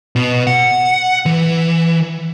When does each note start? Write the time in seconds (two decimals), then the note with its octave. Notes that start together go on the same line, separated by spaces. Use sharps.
0.16 B2
0.47 F#5
1.26 E3